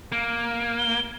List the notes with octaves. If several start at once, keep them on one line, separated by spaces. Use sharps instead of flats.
A#3
G7